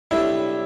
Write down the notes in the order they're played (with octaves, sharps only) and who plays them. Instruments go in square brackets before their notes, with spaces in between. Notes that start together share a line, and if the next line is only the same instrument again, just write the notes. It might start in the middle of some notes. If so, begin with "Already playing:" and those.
[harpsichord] B1 A2 G3 D4 [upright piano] E4